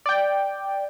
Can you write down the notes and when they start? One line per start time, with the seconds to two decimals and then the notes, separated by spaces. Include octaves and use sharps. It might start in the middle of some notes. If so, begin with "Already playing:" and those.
0.06 D5 G5